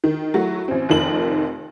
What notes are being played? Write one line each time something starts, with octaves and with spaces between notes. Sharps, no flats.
D#3
F#3 A3 E4 F#4
A1 C4
F1 F2 D#3 F#7